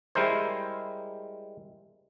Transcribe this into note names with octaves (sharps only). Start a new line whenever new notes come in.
G3 G#3 E4 A#4 C5